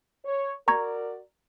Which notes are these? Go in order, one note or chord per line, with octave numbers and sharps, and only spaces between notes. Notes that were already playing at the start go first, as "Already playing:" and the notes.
C#5
F#4 A#4 D5 A#5 C#6 G#6